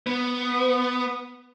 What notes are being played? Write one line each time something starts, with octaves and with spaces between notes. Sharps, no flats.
B3